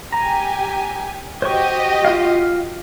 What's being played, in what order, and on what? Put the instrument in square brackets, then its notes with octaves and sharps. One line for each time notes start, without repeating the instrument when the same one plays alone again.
[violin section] G4 G#5 [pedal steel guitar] A#5
[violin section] F#4 G4 D#5 [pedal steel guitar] C5 C#6
[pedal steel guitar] F4 F5